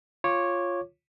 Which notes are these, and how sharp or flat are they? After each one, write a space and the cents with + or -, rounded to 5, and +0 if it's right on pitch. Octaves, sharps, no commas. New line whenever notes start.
F4 +0 C#5 -10 D6 +0